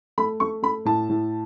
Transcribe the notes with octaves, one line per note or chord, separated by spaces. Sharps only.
A3 B5
A3 C#6
A3 B5
A2 A5
A2